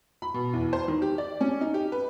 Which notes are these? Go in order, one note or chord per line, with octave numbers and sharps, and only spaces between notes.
B5
B2
E2
C5
D#3
G4
D5
C#4
D#4
G4
B4